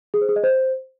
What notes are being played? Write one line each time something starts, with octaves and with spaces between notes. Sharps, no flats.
G#4
C5
G#4
D#5
C5